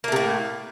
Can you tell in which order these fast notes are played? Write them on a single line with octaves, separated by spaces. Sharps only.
A#3 A3 C3 A2